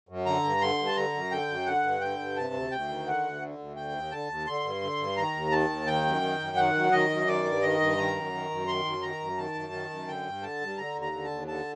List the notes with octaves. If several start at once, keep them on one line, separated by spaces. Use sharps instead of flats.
F#2
D3 A#5
G2
D3 C6
G2
A5
D3 A#5
F#2
D3 G5
F#2
D3 F#5
G2
D3 G5
G2
C3 A5
D2
D2 G5
D#3
D3 F#5
D2
D3
D2
D3 G5
D#2
D3 A5
D#2
D3 C6
G2
D3
G2
D#3 A#5
D#2
D#3 A5
D#2
D#3 G5
F#2
D#3
F#2
D#3 F#5
F#2
D#3 D#5
F#2
D#3 D5
G2
D#3 D#5
G2
D#3 A#5
F#2
D#3
F#2
D#3 C6
F#2
D#3 A#5
F#2
D#3 A5
F#2
D#3
F#2
D3 G5
G2
D3 A5
G2
D3 A#5
D#2
A#5
D3
A5
D#2
D3 A5